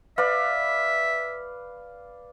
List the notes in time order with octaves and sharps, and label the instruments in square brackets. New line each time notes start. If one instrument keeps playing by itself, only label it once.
[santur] B4 D5 F5 [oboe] E5